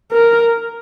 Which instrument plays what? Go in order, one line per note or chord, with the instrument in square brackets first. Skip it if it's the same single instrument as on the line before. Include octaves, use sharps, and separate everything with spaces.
[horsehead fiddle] A#4